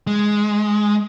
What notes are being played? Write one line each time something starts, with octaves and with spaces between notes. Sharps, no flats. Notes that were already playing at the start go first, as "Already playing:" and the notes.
G#3